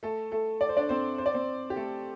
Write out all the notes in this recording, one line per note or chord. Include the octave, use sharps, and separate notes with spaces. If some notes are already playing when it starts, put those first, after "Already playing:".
A3 A4
A3 A4
D5
C5
D4 D5
C4 C5
C5
D5
C4 C5
G4
A3 A4